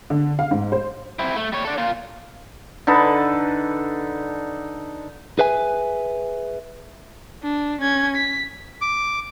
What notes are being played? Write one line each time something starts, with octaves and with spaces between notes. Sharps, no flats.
D3
F5
G#2
C5
C4 E4
A3
G3 C#5
D4 A4
A#2 F4
D3 D#4 A4 B4
G#4 B4 E5 G#5
D4
C#4 G#6
B6
D6